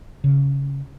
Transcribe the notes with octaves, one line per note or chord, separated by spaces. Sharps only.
C#3